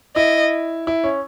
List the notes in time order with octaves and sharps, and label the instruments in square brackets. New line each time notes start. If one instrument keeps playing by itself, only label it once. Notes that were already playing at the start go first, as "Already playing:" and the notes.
[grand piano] E4 [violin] D#5
[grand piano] E4
C#4